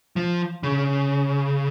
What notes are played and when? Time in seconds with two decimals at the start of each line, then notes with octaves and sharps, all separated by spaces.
0.16 F3
0.63 C#3